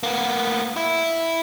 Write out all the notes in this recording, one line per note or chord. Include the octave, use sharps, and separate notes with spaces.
A#3 B3
E4